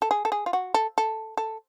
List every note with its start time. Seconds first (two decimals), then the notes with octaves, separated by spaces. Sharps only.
0.02 A4
0.11 G#4
0.25 A4
0.32 G#4
0.46 F4
0.53 F#4
0.74 A4
0.98 A4
1.37 A4